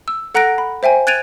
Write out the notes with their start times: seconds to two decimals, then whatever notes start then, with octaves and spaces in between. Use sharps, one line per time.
0.08 E6
0.35 A4 F#5 A#5 F#6 A#6 D7
0.58 B5
0.83 C5 E5 G5 G#5
1.07 F#6 G#6 A6 D7 D#7 F7